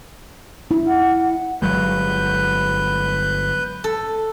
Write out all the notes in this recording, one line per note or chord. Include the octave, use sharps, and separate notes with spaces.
E4
F#5
G1 F#3 G#3 B4 G6
A4